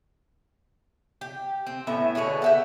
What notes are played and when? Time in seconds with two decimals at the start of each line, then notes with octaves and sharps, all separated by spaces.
1.21 G4
1.66 C4
1.87 A2 B3 C#4 E5
2.15 B2 D3 G#4 C#5
2.42 G4 E5 F#5